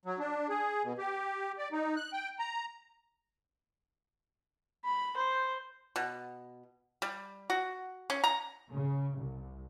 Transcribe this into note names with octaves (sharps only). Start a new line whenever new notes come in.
F#3
D4
G#4
B2
G4
D5
D#4
F#6
G5
A#5
B5
C5
B2
G3
F#4
C#4
A#5
C#3
C2